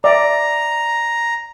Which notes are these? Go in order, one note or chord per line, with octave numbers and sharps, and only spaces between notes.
D5 E5 A#5